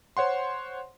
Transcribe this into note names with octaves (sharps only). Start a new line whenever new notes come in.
C5 C#5 F#5 C6